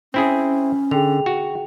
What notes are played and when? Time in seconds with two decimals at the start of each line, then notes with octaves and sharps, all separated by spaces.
0.14 C4 C#4 E4 G#4
0.91 D3 G#4 G5 F7
1.26 F#4